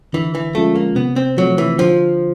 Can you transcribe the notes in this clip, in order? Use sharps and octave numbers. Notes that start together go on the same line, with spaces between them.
D3 E3
E3
F3 G#3 A3 C#4 F4
A#3
C3 B3
C4
F3 F#3 A3 C4
E3
D3 F3